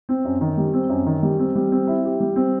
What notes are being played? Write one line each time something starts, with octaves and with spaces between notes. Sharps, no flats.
C4
F#2
D#3
G3
C4
F#2
D#3
G3
C4
G3
C4
E4
G4
G3
C4